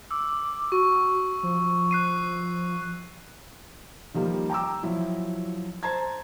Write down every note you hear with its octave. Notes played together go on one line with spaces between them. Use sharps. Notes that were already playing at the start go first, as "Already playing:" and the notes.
D6 E6
F#4 C#6
F3
F#6 C7 D#7
D#3 F3 G3 A#3
G5 A#5 D6 E6
F3 F#3 E4
C5 A5 A#5 G#6